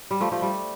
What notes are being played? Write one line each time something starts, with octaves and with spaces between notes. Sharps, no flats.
G3
F3 A3
F3 A3
G3